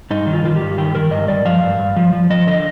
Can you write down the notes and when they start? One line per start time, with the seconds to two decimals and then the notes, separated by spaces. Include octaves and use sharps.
0.11 G2 D#4
0.27 D#3
0.33 F4
0.44 D#3 F4
0.56 G4
0.61 G2
0.78 D#3 G4
0.95 D#3 A#4
1.11 G2 D#5
1.28 G2 D5
1.45 F3 F5
1.63 G2
1.79 G2
1.96 F3
2.13 F3
2.30 F3 D#5
2.47 D3 D#5